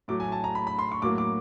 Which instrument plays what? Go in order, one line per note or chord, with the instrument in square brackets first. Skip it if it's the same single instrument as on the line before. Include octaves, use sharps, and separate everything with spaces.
[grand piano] A2 F#3 A3 D6
G#5
A5
A#5
B5
B5
C6
C#6
A2 F#3 A#3 D6
D6